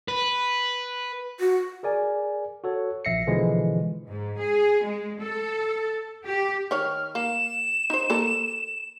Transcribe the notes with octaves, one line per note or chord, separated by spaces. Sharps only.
B4
F#4
G#4 A#4 D5 G#5
F#4 A4 C#5
A#1 E5 A#6 C7 C#7
B2 D3 E3 F3 G#3
G#2
G#4
G#3
A4
G4
D#3 C#5 F6
A#3 E7
D#4 C5
A#3 A4 A#4